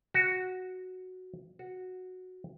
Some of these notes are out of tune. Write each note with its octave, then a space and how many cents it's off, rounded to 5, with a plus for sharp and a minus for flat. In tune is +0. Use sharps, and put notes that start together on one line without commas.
F#4 +0
F#4 -5